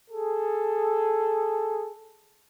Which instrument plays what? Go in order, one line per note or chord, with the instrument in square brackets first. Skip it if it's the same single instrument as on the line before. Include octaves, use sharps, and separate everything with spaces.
[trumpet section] G#4 A4